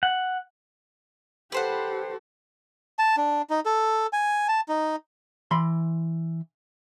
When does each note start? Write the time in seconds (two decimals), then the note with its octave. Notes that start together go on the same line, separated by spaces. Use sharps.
0.03 F#5
1.52 G4 A4 B4 C5 F#5
2.99 A5
3.17 D4
3.50 D#4
3.65 A4
4.13 G#5
4.48 A5
4.69 D#4
5.51 E3 B5 C6